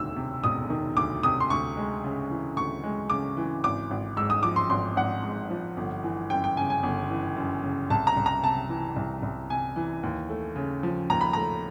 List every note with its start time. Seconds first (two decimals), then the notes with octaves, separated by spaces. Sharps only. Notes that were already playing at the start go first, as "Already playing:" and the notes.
Already playing: E1 D2 D#3 E6
0.16 C3
0.44 E1 D#6
0.70 D#3
0.96 D2 D6
1.23 C3 D#6
1.40 C6
1.50 D2 C#6
1.77 G#3
2.04 C#3
2.30 E3
2.56 D2 C#6
2.83 G#3
3.10 C#3 D6
3.37 E3
3.64 G#1 D6
3.91 G#1
4.17 G#2 E6
4.30 D#6
4.43 F3 D6
4.56 C6
4.70 G#1 C6
4.96 G#1 F#5
5.23 G#2
5.50 F3
5.77 G1
6.03 E3
6.30 F#2 G5
6.44 G5
6.57 C#3 G#5
6.70 G#5
6.83 G1
7.10 E3
7.36 F#2
7.64 C#3
7.90 C2 A5
8.07 A#5
8.16 C2
8.26 A#5
8.43 C3 A5
8.69 E3
8.96 C2
9.22 C2
9.50 C3 G#5
9.76 E3
10.03 D#2
10.30 A3
10.56 C#3
10.83 F3
11.10 D#2 A#5
11.21 B5
11.33 A3 A#5